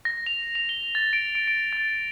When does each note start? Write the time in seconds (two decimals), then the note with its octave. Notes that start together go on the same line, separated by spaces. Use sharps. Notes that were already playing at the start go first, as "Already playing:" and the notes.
0.05 A#6
0.26 F7
0.55 F7
0.69 G7
0.95 A6
1.13 D7
1.35 D7
1.48 D7
1.73 A6